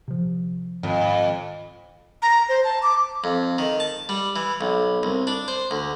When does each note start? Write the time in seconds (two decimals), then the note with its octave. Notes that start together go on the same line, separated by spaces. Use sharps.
0.08 C3 F3
0.83 F2 G#2 D#3
2.22 A#5
2.49 C5
2.64 A5
2.83 D6
3.24 F2
3.58 D#3
3.80 A5
4.09 G3
4.36 E3
4.61 B1
5.03 C2
5.27 D4
5.48 C5
5.71 D2